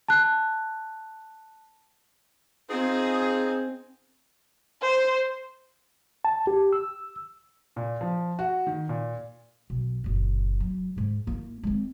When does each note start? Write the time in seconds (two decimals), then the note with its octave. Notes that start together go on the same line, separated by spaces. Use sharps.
0.08 A5 F#6
2.70 C4 D#4 F4 G#4
4.82 C5
6.25 A5
6.47 G4
6.73 E6
7.76 A#2
8.01 F3
8.39 F#4
8.67 D#3
8.89 A#2
9.70 B1
10.04 F#1 A#2
10.60 F#3
10.96 G#2 G#3
11.27 A#3 E4
11.63 G#3 C4